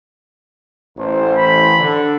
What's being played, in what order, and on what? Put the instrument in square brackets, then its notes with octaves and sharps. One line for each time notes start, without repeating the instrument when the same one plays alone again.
[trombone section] A1 C5
[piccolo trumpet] B5
[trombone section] D3